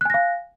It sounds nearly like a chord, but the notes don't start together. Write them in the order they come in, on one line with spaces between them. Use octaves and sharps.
F#6 G#5 A#6 F5